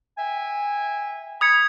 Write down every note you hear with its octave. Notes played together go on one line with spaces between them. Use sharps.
E5 G5 G#5
B5 D#6 G#6 C#7